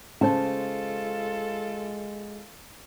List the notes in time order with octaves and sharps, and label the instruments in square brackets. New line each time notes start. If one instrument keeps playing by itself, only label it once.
[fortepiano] C#3 [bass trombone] G#3 [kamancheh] F4 A4 [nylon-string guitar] C5 A5